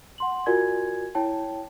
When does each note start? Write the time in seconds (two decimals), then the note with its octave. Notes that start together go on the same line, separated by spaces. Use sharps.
0.18 F#5 C6 F#7
0.46 F4 F#4 A#4 D5 G#5 G#6
1.15 E4 C#5 G5 A5